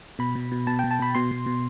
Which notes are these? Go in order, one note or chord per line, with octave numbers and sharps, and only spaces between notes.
B2 B5
B2
B2
B2 A5
G5
B2
A5
B2 B5
B2 C6
B2
B2